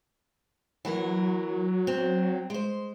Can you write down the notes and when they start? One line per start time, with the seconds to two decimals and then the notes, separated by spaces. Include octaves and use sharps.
0.85 E3 F#3 A#3 A#4
1.87 C4
2.50 G#3 C5